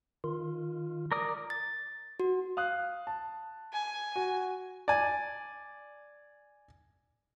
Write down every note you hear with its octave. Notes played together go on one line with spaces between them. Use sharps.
D#3 F4
A#4 D5 D#6
A6
F#4
F5 D#6 F#6
A5
G#5
F#4
D5 G#5